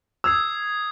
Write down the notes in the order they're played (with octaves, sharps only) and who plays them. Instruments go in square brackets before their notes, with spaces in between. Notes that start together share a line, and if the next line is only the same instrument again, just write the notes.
[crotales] D#6 G#6 C7 [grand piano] E6